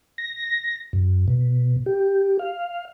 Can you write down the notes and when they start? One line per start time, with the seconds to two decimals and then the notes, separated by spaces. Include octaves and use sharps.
0.18 A#6
0.93 F#2
1.28 B2
1.86 G4
2.39 F5